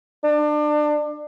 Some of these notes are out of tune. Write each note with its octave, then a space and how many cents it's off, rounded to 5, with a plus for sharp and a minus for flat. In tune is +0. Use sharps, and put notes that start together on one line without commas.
D4 +30